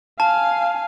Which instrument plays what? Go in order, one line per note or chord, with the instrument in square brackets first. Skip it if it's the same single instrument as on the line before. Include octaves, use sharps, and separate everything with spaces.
[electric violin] F5 G#5 [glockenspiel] A5